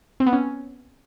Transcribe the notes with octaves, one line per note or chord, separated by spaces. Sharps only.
C4
B3
C#4